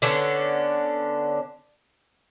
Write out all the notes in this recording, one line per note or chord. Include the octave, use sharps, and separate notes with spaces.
D3 B3 C#4 D4